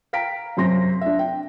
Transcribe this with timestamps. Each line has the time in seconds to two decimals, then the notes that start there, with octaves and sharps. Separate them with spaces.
0.13 F5 G5 A#5 B6 D7
0.57 F#2 C3 C6 A#6
1.01 D4 E5
1.19 G5